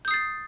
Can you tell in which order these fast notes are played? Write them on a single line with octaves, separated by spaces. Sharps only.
G6 D#6 C7 A6